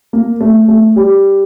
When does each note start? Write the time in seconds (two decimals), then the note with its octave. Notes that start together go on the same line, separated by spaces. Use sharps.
0.13 A#3
0.41 A3
0.68 A3
0.96 G3